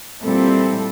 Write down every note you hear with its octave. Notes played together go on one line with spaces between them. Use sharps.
A#2 G3 C4 E4 A4